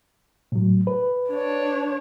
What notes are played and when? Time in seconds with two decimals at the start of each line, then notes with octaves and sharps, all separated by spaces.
0.52 A2 F#3
0.87 B4
1.30 D4 C#5